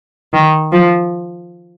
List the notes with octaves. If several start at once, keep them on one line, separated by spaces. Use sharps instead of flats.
D#3
F3